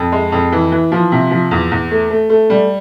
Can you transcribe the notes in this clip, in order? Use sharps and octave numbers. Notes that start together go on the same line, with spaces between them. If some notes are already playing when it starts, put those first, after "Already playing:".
Already playing: F2
G#3
F2
E3
E3
F3
C3
F3
E2
E2
A3
A3
A3
G3